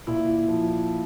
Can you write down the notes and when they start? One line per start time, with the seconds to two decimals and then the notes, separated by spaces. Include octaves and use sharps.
0.07 A#2 E4
0.48 F3